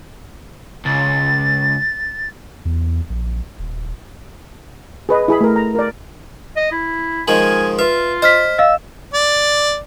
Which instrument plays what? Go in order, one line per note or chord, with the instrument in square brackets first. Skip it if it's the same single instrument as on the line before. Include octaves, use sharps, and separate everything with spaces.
[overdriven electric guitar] C#2 [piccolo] A6
[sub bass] E2
A#1
D#1
[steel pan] G#4 B4 D#5
E4 G#4 B5
A3 A#4
A#5
A#4 D5
[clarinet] D#5
E4
[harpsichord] D#3 F3 G#3 [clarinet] G#5 [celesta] F#7
[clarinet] F4 [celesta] B4 [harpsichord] E5
[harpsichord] C5 [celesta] D#5 F6 B6
[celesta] D#5 F5 [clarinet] E6
[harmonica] D5